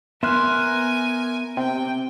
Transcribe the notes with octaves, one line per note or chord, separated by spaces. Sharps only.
B3 A#4 E5 G#5 C6 F6 F#6
C3 G5